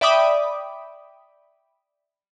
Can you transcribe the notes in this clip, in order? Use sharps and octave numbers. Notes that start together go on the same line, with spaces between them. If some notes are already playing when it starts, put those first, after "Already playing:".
D5 E5 G5 B5 D6 D#6